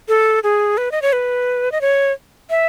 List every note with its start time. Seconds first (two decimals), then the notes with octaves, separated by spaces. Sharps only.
0.08 A4
0.43 G#4
0.78 B4
0.92 D#5
1.02 C#5
1.13 B4
1.72 D#5
1.81 C#5
2.50 E5